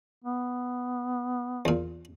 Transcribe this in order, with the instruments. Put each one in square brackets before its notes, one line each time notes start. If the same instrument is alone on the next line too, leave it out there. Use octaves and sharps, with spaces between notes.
[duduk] B3
[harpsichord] E2 A#2